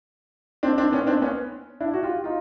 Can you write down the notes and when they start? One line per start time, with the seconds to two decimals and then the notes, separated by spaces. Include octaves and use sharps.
0.63 C4 D4
0.78 C4 D4
0.92 B3 C#4
1.07 C4 D4
1.22 B3 C#4
1.81 D4 E4
1.94 F#4
2.03 F4 G4
2.24 D#4 F4